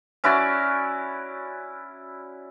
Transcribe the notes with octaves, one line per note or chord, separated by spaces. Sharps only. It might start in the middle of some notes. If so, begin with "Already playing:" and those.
C#4 E4 F#4 D5